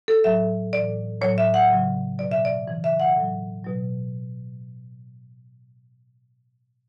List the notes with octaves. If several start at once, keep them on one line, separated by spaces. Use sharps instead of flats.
A4
A2 F#3 E5
A2 E3 D5
A2 F#3 C#5
E5
F#5
C#3 F#3
B2 F#3 D5
E5
D5
C#3 E3
E5
F#5
A2 F#3
B2 F#3